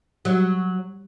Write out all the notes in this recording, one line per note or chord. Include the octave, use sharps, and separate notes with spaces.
F#3